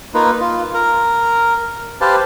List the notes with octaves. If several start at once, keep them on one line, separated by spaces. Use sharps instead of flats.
A#3 D#4 F4 B4
F4
A#4
G4 B4 C5 F5 A5